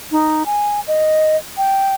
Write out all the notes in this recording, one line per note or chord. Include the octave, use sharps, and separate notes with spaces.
D#4
G#5
D#5
G5